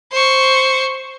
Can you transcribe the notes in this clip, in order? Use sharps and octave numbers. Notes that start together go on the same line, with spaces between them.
C5 C#6